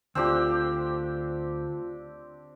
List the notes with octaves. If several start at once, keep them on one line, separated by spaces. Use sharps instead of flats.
D2 C4 D4 F4 G4 E6